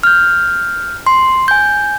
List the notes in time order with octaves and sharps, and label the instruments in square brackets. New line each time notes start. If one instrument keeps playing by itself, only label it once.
[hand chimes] F6 G6
C6
G#5 G6